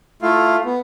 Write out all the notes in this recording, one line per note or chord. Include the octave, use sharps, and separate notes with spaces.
A3 E4 F4 F5
B3